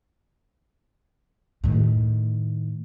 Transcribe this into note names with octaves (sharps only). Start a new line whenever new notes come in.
A2 D#3